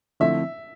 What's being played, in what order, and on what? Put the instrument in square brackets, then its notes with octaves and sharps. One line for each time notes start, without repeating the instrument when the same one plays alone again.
[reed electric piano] D3 F3 A3 C4 E4 [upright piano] E5